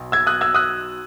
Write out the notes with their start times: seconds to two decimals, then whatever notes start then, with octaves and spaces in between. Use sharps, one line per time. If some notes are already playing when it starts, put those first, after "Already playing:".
Already playing: B1 B2
0.12 E6 G#6
0.27 D#6 F#6
0.41 E6 G#6
0.54 D#6 F#6